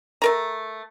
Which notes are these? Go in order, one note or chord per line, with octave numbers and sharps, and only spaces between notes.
A3 A#4 A#5